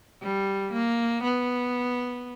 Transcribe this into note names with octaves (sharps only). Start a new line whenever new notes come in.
G3
A#3
B3